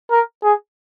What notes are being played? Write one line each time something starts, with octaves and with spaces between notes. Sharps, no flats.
A#4
G#4